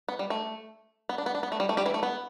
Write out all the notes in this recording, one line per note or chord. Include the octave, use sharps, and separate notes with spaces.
B3
G3
A3
B3
D4
B3
D4
B3
A3
G3
A3
G3 G4
E3 E4
A3
B3